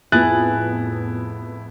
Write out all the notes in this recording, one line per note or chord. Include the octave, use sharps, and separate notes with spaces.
F2 A2 B3 E4 G#4 F#6 A6